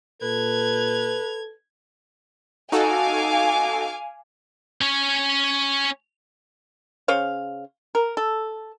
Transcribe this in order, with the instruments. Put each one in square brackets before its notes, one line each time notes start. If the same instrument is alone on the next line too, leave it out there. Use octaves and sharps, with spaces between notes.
[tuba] A#2 [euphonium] A4 [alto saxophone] B4 [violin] G#6 F7
[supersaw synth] D#4 F#4 A4 [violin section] F5 G#5 D6
[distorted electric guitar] C#4 C#5
[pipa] C#3 C5 C#5 F5
A#4
A4